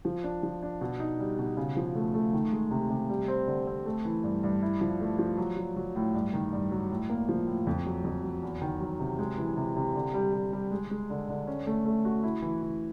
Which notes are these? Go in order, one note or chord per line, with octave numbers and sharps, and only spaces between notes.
F3
D4
F3
D4
B2
D#4
G3
B2
C#3
F3
A3
A3
D#3
G#3
C3
C3
G3
C4
D3
C4
A3
E3
G2
G2
E4
F3
A3
F3
F#3
F#3
F#3
A2
G2
D#3
G2
F#3
A2
A#3
F3
A2
F2
F#3
F2
F#3
E2
D#3
F#3
C3
G#3
E3
C3
C3
D3
G3
G3
G3
G#3
G#3
D3
D3
C#4
A3
A3
F#4
E4
E3
E3